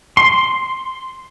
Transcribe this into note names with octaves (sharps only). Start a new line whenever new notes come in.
C6